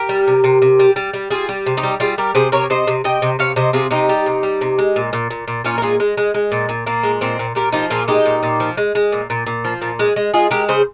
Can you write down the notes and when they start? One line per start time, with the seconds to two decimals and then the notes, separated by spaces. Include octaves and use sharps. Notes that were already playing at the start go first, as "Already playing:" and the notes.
Already playing: G4 A#4
0.09 G3
0.27 C3
0.44 C3
0.62 C3
0.79 G3
0.96 G3
1.13 G3
1.30 G3 F4 G#4
1.49 G3
1.66 C3
1.77 D#4 G4
1.83 G3
2.00 G3 F4 G#4
2.18 G3 G4 A#4
2.35 C3 G#4 C5
2.52 C3 A#4 C#5
2.70 C3 C5 D#5
2.87 C3
3.04 C3 D#5 G5
3.22 C3
3.39 C3 C#5 F5
3.56 C3 C5 D#5
3.73 C3 F4 G#4
3.91 C3 D#4 G4
4.09 G3
4.26 C3
4.43 G3
4.61 C3
4.78 G#3
4.96 A#2
5.13 A#2
5.31 A#2
5.48 A#2
5.64 A#2 C#4 F4
5.78 A#4
5.82 G#3 F4 G#4
6.00 G#3
6.17 G#3
6.34 G#3
6.52 A#2
6.69 A#2
6.86 A#2 A#3
7.03 G#3
7.21 A#2 C4
7.39 A#2
7.55 A#2 G4 A#4
7.72 F3 D#4 G4
7.90 A#2 F4 G#4
8.08 G#3 D#4 G4
8.25 A#2
8.43 A#2
8.60 F3
8.77 G#3
8.95 G#3
9.12 A#2
9.30 A#2
9.47 A#2
9.65 F3
9.82 A#2
9.99 G#3
10.16 G#3
10.34 G#3 F4 G#4
10.51 G#3 G4 A#4
10.69 C#3 G#4 C5